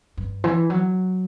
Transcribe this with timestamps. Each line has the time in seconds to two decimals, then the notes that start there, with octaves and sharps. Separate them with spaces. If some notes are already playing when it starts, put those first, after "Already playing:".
0.17 G2
0.44 E3
0.70 F#3